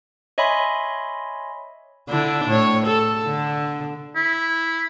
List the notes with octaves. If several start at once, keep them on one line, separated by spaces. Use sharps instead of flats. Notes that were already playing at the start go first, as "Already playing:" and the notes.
C#5 D#5 E5 G#5 B5 C6
D3 D4 E4
A2 C#5
A4
D3
E4